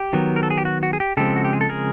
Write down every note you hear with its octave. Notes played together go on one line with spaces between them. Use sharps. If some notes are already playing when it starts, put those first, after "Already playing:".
Already playing: G4
D#3 F#3 B3
A#4
A4
G#4
G4
F#4
F#4
G#4
G4
C#3 F3 G#3 C4 G4 A4
F#4
G4
G#4
A4
G#4 A#4